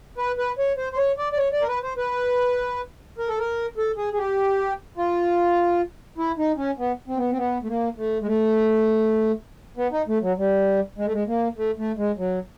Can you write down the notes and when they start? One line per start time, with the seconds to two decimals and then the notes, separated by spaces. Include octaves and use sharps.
0.18 B4
0.38 B4
0.58 C#5
0.77 C5
0.93 C5
0.98 C#5
1.18 D5
1.32 D5
1.38 C#5
1.53 D5
1.62 A#4
1.68 B4
1.83 C5
1.97 B4
3.18 A#4
3.28 A4
3.39 A#4
3.78 A4
3.97 G#4
4.13 G#4
4.18 G4
4.97 F4
6.18 E4
6.38 D#4
6.57 C#4
6.78 B3
7.08 C4
7.17 B3
7.31 C4
7.37 B3
7.63 A3
7.68 A#3
7.97 A3
8.22 G#3
8.27 A3
9.77 B3
9.92 D#4
10.08 A3
10.22 F#3
10.38 G3
10.98 G#3
11.05 A3
11.13 G#3
11.27 A#3
11.57 A3
11.78 A3
11.98 G#3
12.18 F#3